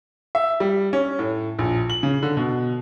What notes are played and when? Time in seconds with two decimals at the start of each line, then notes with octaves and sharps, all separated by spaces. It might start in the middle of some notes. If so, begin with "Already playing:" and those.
0.35 E5
0.60 G3
0.93 C#4
1.19 A2
1.59 A#1
1.90 F#7
2.03 C#3
2.23 D3
2.37 B2